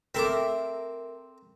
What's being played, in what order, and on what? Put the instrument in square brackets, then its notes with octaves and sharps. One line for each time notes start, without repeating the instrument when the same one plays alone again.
[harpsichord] C4 A4 D6 [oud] A#4 E5